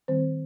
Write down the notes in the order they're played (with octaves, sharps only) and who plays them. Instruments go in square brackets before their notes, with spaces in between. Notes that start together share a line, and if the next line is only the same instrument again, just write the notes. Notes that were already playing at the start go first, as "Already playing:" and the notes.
[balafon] D#3 G3 C4 C5